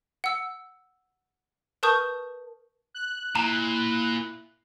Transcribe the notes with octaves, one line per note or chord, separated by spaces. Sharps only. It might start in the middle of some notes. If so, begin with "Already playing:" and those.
F#5 E6
A#4 B4 A5 C#6 D#6 G6
F#6
A#2 E4 A#5